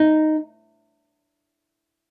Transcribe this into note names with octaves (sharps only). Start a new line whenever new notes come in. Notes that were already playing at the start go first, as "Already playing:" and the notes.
Already playing: D#4